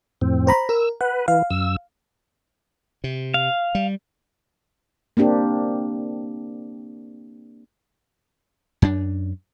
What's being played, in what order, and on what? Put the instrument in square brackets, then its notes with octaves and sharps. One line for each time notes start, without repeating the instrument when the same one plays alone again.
[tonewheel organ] F2 A2 C4
[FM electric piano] C5 A#5 B5
[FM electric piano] A#4 [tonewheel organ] E6
[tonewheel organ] B4 [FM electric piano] F#5
[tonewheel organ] E3 [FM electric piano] F5
[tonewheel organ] F#2 E6
[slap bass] C3
[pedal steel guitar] F5
[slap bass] G3
[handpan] A#3 C4 D4 G4
[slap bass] F#2 D4